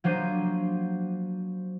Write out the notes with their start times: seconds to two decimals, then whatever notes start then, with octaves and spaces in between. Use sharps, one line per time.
0.04 F3 F#3 A#3 D4 C5 D#7